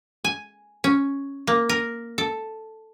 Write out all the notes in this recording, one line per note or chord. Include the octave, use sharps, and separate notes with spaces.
G#5
C#4
A#3
A#4
A4